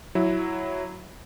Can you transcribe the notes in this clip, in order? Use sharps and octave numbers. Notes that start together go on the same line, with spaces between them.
F#3 E4